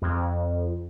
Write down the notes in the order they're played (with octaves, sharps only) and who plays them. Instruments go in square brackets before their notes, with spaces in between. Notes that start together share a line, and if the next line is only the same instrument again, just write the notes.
[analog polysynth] F2